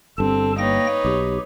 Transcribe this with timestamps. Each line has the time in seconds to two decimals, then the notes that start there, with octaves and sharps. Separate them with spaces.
0.18 G1 G2 C4 A4 A5
0.58 A#3 D#4 B4 C#5 G5 A#6
1.05 B1 G4